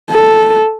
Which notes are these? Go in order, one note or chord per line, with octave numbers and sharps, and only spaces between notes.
A4